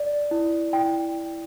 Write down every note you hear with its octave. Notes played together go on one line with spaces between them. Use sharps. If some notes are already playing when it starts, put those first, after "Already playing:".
Already playing: D5
E4
E4 G5